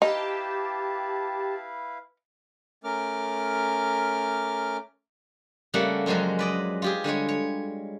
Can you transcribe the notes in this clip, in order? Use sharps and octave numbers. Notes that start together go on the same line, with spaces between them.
D#4 E4 G4 B4 F5 A5
A3 C#4 A#4 D6 F6
C#3 G3 A3 A#3 A4 F#5
F#2 F3 F#3 G#3 C#4
B4 D5 D#5
F4 G4 G#4
D3 G3 G#3 C#5
C#5